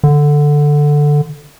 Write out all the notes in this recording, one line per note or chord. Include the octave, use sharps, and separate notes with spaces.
D3